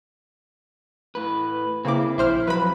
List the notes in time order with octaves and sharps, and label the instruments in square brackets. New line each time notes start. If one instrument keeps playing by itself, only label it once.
[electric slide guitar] A2 B4
[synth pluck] C#3 A#3 D6 [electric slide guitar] C4 E4
[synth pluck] A#1 C5 F6 [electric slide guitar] E4
[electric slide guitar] F2 F3 F#3 [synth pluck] B4 B5